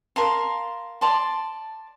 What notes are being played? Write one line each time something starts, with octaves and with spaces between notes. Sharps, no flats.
A#4 F5 A5 C6
D5 A5 C6